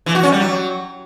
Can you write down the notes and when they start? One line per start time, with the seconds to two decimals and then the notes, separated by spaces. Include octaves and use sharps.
0.06 E3
0.15 F#4
0.23 C#4
0.32 G3
0.40 F#3